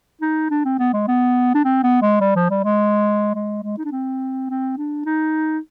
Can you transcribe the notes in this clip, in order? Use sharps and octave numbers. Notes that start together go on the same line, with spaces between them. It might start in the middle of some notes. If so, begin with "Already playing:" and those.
D#4
D4
C4
B3
G#3
B3
D4
C4
B3
G#3
G3
F3
G3
G#3
G#3
G#3
D#4
D4
C4
C4
D4
D#4